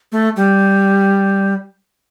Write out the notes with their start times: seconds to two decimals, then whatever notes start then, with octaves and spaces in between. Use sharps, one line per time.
0.12 A3
0.36 G3